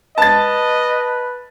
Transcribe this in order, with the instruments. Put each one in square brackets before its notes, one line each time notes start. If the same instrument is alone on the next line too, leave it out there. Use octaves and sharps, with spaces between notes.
[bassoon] B4 [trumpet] D#5 [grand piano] A5 A6